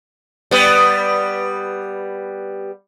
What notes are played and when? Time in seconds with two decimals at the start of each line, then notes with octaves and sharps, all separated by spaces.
0.51 G3 B3